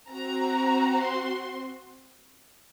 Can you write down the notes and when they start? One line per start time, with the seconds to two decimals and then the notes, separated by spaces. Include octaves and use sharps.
0.11 C4 F#4 A#5
1.03 C6